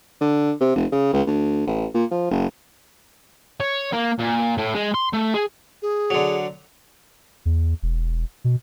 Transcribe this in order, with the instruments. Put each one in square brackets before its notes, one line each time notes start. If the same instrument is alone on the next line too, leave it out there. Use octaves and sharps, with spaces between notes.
[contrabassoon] D3
C3
F1
C#3
C#2
D2
A1
A#2
F3
F#1
[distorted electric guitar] C#5
A#3
A#2
A2
G#3
C6
A3
G#4
[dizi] G#4
[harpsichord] D3 F#3
[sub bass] E2
E1
B2